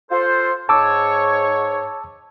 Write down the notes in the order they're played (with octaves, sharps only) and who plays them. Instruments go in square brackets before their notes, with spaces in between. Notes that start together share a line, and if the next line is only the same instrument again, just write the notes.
[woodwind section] F4 A4 C5
[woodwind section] G#2 C#5 [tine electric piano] A5 D6 E6